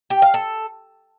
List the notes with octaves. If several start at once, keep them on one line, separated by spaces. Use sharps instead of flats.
G4
F5
A4